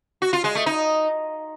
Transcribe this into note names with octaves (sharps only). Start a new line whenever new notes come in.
F#4
F4
G#3
A3
D#4